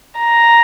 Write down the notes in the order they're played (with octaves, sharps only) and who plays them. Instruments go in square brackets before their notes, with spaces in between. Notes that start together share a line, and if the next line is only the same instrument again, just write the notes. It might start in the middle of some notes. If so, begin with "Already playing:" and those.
[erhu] A#5